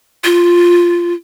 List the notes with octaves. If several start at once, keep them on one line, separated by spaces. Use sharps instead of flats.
F4